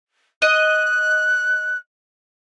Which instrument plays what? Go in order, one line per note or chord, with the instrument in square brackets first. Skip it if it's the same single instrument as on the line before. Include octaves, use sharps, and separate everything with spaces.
[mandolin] D#5 [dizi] F#6